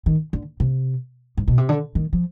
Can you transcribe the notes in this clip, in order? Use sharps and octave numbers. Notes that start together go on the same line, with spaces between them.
D#3
D3
C3
G#2
B2
C3
D3
D#3
F3